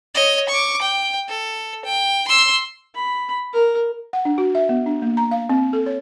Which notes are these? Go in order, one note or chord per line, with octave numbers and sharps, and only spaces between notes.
C#5 D#5
C#6 D6
G5
A4
G5
C6 E6
B5
A#4
F#5
D4
F#4
E5
B3
D4
A#3
A#5
F5
C4
A4
C#5